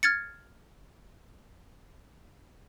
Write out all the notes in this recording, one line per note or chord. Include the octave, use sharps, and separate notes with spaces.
F6 G#6 A6 C#7